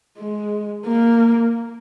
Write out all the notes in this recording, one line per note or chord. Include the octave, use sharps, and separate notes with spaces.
G#3
A#3